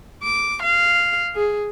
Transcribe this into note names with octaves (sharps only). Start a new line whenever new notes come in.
D6
F5
G#4